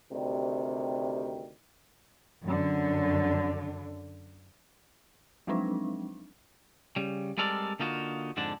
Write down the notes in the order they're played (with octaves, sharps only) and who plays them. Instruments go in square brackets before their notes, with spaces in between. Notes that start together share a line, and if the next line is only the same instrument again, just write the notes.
[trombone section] D2 C3 D#3 G3
[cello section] F#2 D3
[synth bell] F3 F#3 G#3 C4 D4 D#4
[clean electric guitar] C#3 G3
G3 G#3 C4 A4 A#4 D5
D3 A#3 D#4 F4 F#4
F2 G#2 D3 D4